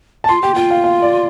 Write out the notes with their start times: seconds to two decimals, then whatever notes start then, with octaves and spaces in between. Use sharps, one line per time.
0.24 A5
0.28 F4 C6
0.42 G4 G5
0.55 F4 G5
0.70 F5
0.84 F5
1.02 D5